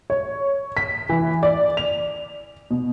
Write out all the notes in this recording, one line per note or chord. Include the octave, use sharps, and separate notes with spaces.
C#5
B6
E3
D5
F7
B2